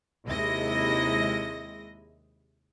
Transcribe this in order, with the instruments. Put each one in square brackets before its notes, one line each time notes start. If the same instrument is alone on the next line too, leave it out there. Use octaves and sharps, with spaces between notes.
[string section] D#2 C3 G#3 E4 D#5 A#6